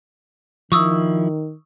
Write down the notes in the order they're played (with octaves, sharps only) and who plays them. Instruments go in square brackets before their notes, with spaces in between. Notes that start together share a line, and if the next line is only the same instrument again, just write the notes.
[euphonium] D#3 [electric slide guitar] F3 E4 [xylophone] C#6 D#6 E6